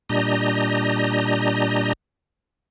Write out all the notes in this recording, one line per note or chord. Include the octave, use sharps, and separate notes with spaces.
A#2 G3 D4 D#5 A#5 G6